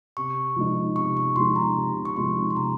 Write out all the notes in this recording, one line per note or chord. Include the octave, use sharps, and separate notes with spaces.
C3 C#6
F3 G#3 D#4
C3 C#6
C#6
F3 G#3 D#4 C6
A#5
C3
C#6
F3 G#3 D#4 C6
C6
C3 A#5